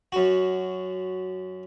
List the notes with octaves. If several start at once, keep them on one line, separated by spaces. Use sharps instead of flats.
F#2 F#4